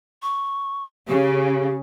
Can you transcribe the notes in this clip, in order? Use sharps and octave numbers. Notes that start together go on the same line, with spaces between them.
C#6
C#3 G4